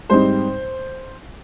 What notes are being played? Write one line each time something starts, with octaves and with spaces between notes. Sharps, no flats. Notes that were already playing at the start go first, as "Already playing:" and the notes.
G#2 G3 C4 D#4 C5